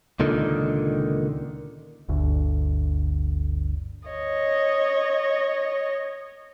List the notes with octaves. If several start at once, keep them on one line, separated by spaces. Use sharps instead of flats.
C#2 A#2 D3 D#3
G1 D2 D3
C#5 D#5